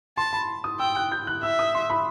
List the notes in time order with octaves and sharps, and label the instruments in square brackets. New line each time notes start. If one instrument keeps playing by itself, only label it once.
[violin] A5 [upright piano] C6
[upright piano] B5
D#6
[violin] G5 [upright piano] E6
[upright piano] F#6
G6
F#6
[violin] E5 [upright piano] E6
[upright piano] D#6
C6
B5